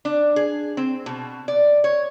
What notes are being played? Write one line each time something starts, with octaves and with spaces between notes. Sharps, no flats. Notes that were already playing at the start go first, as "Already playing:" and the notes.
D4
G#4
C4
B2
D5
C#5